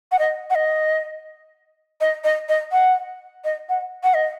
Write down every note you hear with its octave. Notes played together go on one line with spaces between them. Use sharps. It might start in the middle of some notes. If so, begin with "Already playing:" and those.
F#5
D#5
F#5
D#5
D#5
D#5
D#5
F#5
D#5
F#5
F#5
D#5